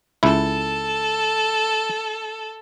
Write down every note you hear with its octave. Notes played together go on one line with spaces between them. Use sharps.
C#2 E4 A4